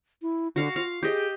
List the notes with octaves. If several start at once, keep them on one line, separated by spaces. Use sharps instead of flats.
E4
D3 F#4 F5
F4 F5
G4 G#4 D#5